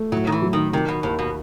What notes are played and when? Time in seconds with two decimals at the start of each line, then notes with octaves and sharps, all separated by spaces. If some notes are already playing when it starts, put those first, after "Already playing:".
Already playing: A3
0.12 A2 F#3
0.27 D#3
0.32 E3
0.42 F#3
0.53 D#3
0.73 C3 D#3
0.88 B2
1.03 D#2 A2
1.19 B2